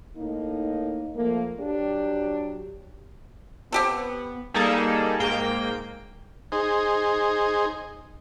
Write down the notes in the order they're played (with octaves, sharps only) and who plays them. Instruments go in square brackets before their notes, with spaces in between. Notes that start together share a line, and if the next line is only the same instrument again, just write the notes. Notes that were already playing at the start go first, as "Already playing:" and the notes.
[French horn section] A2 A#3 D#4
F3 A3 A#3
F#3 D4 G4
[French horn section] B3 [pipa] C4 G4 A4
[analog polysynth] G3 A#3 D#4 G#4 A4
G#2 A#3 G5
[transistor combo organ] D#4 G#4 C5